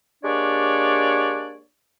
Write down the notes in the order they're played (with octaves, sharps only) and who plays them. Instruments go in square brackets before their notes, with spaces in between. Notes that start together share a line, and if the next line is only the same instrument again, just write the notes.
[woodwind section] G#3 A#3 D4 G4 C#5 D5